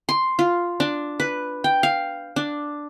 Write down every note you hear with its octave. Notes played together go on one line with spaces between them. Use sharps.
C6
F4
D4
B4
G5
F5
D4